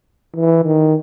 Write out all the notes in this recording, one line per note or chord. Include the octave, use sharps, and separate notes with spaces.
E3
D#3